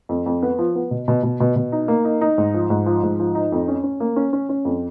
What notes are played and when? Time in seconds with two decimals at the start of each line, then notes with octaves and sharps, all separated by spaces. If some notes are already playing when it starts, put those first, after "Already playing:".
0.09 F2
0.26 F2
0.43 B3
0.59 F3
0.75 B3
0.91 B2
1.08 B2
1.23 B2
1.40 B2
1.56 B2
1.72 D#4
1.88 A#3
2.05 D#4
2.21 D#4
2.38 G#2
2.54 F3
2.70 G#2
2.86 F3
3.03 G#2
3.20 F3
3.35 D#4
3.52 F2
3.68 C#4
3.84 C#4
4.00 A#3
4.16 C#4
4.33 C#4
4.49 C#4
4.65 F2